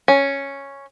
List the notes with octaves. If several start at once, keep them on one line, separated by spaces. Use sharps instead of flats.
C#4